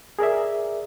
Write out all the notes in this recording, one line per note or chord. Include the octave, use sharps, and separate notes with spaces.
G#4 A#4 D5 E5